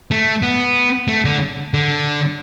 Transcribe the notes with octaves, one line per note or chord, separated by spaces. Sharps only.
A3
B3
A3
D3
D3